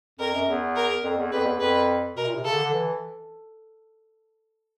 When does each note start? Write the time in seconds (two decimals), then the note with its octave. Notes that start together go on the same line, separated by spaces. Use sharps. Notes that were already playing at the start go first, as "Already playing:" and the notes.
0.19 F2 A#4
0.34 F#2
0.48 E2
0.76 A#4
1.04 F2
1.18 E2
1.32 F2 B4
1.46 E2
1.60 F2 B4
2.16 B2 A#4
2.26 A#2
2.35 C3
2.44 C#3 A4
2.54 D3
2.64 D3
2.73 E3